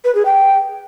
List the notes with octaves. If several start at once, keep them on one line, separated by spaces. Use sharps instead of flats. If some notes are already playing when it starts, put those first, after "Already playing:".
B4
G#4
G5